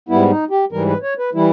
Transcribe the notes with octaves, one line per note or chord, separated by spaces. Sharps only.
G#2 G3 B3 E4
D#4
G4
G#2 E3 G3 A#4
B4
C#5
B4
E3 G3 E4